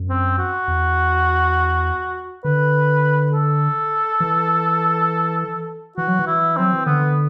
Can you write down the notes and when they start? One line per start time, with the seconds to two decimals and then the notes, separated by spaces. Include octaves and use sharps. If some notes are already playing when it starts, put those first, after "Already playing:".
Already playing: F#2
0.09 C4
0.38 F#4
0.68 E2
2.44 D3 B4
3.33 A4
4.20 E3
5.97 E3 F#4
6.08 F#3
6.19 E3
6.27 E4
6.57 F#3 C4
6.73 E3
6.86 D3 B3